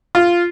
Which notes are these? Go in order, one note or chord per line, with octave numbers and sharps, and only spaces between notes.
F4